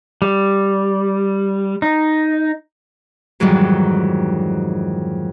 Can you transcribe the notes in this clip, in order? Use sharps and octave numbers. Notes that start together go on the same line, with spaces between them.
G3
D#4
F2 G#2 D#3 E3 F#3 G3